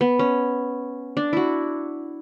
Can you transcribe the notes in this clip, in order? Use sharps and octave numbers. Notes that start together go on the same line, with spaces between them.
B3
C#4
D4
E4 F#4